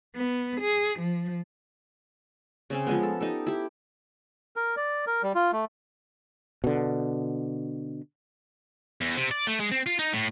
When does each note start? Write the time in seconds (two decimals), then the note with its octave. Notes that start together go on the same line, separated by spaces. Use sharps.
0.16 B3
0.61 G#4
0.99 F3
2.70 C#3 C4 C#4
2.87 F3 G#3 B3
3.03 A4
3.20 D#4 G4 A4
3.46 E4 G4
4.56 A#4
4.77 D5
5.07 A#4
5.23 G3
5.35 F4
5.52 A3
6.64 B2 D3
9.01 E2
9.17 C3
9.31 D5
9.47 A3
9.60 G#3
9.71 C4
9.86 F4
9.99 D#4
10.13 A2